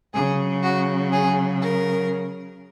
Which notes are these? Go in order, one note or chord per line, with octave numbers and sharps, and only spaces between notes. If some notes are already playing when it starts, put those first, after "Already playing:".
C#3 F#3 G#4
F#4
G#4
A#4